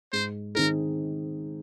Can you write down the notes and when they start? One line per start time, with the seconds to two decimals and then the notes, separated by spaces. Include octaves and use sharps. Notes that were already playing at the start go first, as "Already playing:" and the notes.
0.12 G#2 C5
0.55 D#3 C4 D#4 G#4 A#4